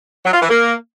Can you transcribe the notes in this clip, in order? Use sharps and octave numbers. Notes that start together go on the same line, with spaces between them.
F#3
F4
E3
A#3